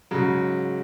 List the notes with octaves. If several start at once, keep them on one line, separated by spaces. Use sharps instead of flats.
G#2 C#3 F#3